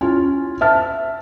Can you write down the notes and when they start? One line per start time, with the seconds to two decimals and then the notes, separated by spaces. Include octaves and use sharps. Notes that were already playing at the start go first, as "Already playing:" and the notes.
0.01 C#4 E4 F4
0.61 E5 A5 F6